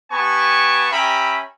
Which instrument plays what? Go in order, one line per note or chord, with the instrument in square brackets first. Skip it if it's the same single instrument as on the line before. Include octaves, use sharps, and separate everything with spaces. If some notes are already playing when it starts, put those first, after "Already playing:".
[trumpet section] B3 G4 G#5 A5 C#6
C#4 G4 E5 G5 A#5 B5